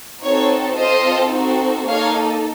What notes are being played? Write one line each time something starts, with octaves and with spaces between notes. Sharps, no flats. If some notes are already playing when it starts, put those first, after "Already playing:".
C4 D#4 F#4 A4 C#5
C4 F4 A4 C5 D#5
C4 D#4 F#4 A4
A#3 D#4 A4 C#5 F5